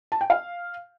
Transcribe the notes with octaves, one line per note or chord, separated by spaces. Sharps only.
A5
G5
F5